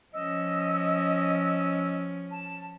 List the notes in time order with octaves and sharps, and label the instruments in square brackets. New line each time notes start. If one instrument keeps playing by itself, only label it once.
[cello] F3 C#4 [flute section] D#5 E6
[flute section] A5